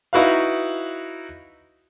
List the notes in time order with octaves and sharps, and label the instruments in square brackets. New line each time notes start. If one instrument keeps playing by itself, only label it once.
[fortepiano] D#4 E4 F#4 B4 F5